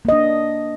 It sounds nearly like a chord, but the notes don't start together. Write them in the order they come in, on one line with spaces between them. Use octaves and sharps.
A#3 D#5 D4